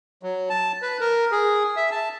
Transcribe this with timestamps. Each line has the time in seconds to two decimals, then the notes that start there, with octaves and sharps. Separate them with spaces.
0.23 F#3
0.50 A5
0.82 B4
1.00 A#4
1.32 G#4
1.76 E5
1.91 A5